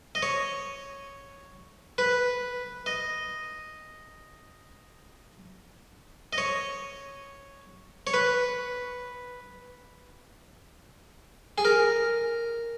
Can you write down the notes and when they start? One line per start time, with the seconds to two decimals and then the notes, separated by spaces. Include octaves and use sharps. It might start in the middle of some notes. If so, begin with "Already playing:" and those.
0.15 D#5
0.22 C#5
1.98 B4
2.86 D#5
6.33 D#5
6.38 C#5
8.07 C#5
8.14 B4
11.58 G#4
11.65 A#4